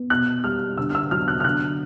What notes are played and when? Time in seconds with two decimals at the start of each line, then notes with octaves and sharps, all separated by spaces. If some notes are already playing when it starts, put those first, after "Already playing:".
Already playing: B3
0.10 B2 F#6
0.44 G3 F6
0.78 D3 E6
0.90 F6
0.95 E6
1.11 F#3 F6
1.28 F#6
1.40 F6
1.45 D3 F#6